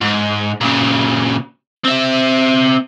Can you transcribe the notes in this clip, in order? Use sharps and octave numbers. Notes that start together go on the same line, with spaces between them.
G#2
A#2 C#3
C4 E5